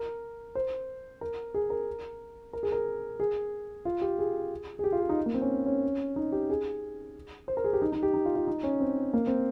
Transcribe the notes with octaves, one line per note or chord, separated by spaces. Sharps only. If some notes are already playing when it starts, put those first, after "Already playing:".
Already playing: A#4
C5
A#4
G#4
A#4
A#4
G#4
A#4
G#4
F4
G4
G#4
G#4
G4
F4
G4
D#4
A#3
C4
C#4
C#4
D#4
G4
G#4
C5
A#4
G#4
G4
D#4
D#4
G4
D#4
F4
F4
D#4
C#4
C4
A#3
C4